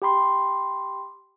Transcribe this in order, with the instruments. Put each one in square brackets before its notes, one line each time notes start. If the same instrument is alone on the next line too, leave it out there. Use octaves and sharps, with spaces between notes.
[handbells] G4 G5 B5 C6